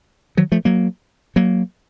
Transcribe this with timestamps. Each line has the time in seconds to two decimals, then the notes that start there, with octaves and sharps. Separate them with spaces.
0.37 D#3 F#3
0.52 F3 A3
0.65 F#3 A#3
1.36 F#3 A#3